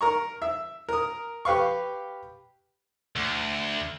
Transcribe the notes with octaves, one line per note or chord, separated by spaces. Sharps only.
A#4 A#5 C#6
E5
A#4 D#6
G4 B4 F5 C#6
D2